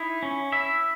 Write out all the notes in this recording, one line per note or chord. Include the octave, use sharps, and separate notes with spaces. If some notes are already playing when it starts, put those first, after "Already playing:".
Already playing: D#4 E4
C#4
E4 E5